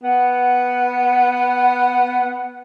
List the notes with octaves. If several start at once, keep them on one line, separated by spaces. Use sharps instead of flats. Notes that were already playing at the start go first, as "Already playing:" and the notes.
B3 F#5